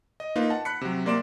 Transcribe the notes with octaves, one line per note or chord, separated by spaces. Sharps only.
D#5
A#3 D#4 F4 B4
F#5 A5
B5 F#6 B6 C#7
C3 F#3
C3 A#3 D5 C6 D6 E7